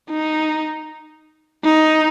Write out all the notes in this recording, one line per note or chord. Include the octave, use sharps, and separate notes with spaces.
D#4
D#4